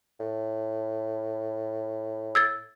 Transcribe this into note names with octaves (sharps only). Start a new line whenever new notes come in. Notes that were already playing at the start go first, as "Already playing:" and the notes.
A2
E6 G#6 A6